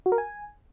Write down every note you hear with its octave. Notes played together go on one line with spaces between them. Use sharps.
F#4
A#4
G#5